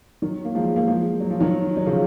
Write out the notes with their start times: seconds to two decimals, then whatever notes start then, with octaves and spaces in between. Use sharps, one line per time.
0.22 D#3 F#3
0.45 A#3
0.55 F3 G#3
0.76 A#3
0.87 F3 G#3
1.20 F#3
1.30 F3
1.40 D#3 F#3
1.77 F#3
1.86 C#3 F3